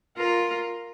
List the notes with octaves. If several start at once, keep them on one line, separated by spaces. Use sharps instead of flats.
F4 A#4